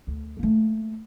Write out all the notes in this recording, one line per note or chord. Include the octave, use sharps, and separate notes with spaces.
D2
A3 A#3